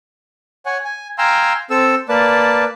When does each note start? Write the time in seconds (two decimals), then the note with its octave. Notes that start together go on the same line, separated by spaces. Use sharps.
0.66 C#5 F#5 G#5
0.85 G#5
1.18 F5 G5 G#5 A#5 C6 E6
1.70 C4 A4 E6
2.09 A#3 B4 D5 A5